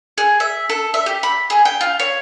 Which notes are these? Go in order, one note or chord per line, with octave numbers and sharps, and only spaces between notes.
G#4
E5
A4
E5
G4
B5
G#4
G5
F4
C#5